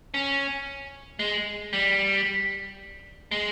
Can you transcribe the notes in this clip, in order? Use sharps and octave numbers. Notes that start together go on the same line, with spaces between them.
C#4
G#3
G3
G#3